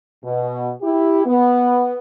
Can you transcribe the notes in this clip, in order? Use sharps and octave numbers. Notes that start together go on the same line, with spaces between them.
B2
E4 G4
B3